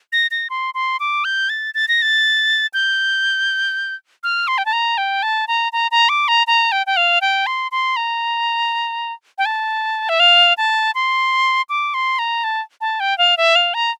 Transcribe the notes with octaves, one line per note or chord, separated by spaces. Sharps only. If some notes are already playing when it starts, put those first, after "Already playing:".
A#6
A#6
C6
C6
D6
G6
A6
A6
A#6
A6
G6
F6
C6
G5
A5
A#5
G5
A5
A#5
A#5
A#5
D6
A#5
A#5
G5
G5
F5
G5
C6
C6
A#5
G5
A5
E5
F5
A5
C6
D6
C6
A#5
A5
A5
G5
F5
E5
F5
A#5